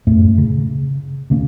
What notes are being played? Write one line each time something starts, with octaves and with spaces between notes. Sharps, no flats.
F#2 A2 A3
C#3
D2 C#3 A#3 C#4